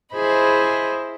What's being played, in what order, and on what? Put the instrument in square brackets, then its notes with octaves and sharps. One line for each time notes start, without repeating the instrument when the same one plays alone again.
[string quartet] E4 G#4 C5 D#5 B5